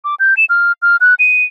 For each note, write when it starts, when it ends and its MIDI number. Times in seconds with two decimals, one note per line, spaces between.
0.05 0.15 86
0.20 0.34 91
0.37 0.45 100
0.50 0.72 89
0.82 0.97 89
1.01 1.14 90
1.19 1.44 99